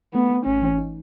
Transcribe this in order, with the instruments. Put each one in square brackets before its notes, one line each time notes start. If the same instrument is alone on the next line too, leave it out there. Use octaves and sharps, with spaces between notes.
[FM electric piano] A3 [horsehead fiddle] B3
[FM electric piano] A3
[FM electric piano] G#1 [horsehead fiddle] C#4
[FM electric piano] E3
D#4